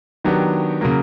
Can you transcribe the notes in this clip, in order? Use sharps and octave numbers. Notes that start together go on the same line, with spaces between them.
D#3 F#3 B3 D4 G4
C#3 F#3 A#3